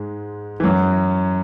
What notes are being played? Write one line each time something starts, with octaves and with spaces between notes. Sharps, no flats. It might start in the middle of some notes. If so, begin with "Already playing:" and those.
Already playing: G#2 G#3
E3
F#2 F#3